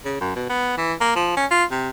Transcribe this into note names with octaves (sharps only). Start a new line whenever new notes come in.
C#3
F#2
B2
B3
E3
A#3
F3
C#4
F4
C3